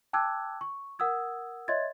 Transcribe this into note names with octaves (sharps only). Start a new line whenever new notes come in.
G5 A5 D6 E6 F#6 G#6
C#6
A#4 F#5 D#6 E6 G#6
C#5 D#5 E5 C6 G#6 A6